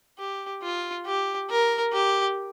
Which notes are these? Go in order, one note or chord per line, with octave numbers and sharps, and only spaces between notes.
G4
F4
G4
A#4
G4